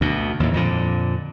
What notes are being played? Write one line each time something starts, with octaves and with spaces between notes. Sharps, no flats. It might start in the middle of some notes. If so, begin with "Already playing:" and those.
D2 B2
D#2 A2
F2 A#2 D3